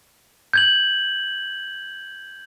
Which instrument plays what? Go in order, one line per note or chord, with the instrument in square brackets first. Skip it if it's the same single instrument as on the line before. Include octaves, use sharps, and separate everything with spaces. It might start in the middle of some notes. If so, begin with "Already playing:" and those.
[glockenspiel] G6 G#6 F#7